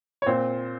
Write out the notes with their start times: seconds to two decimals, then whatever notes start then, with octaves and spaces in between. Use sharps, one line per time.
0.22 C#5
0.26 A#2 C4 C5